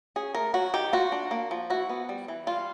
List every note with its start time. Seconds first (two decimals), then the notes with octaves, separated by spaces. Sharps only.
0.16 C#4 G#4
0.35 A3 A#4
0.54 F#3 F#4
0.74 D#3 G4
0.93 F4 F#4
1.12 D4
1.31 A#3
1.51 F3
1.70 E4 F#4
1.89 B3
2.09 G3
2.28 E3
2.47 G3 F4